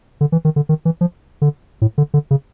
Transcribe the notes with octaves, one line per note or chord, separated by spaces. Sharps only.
D3
E3
D#3
D3
D#3
E3
F3
D3
A2
D3
D3
C#3